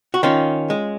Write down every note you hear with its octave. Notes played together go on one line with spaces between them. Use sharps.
F#4
D#3 C#4 F4
G#3